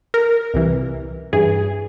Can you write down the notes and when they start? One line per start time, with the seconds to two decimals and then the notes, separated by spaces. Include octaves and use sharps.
0.14 A#4
0.54 C2 C3 E3
1.33 G2 E3 G#4